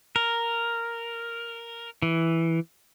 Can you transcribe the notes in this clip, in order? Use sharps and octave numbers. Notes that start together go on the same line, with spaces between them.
A#4
E3